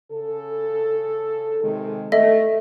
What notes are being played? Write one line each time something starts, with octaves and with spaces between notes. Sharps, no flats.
C#3 A4
C3 D#3 G#3
A3 A4 D#5 E5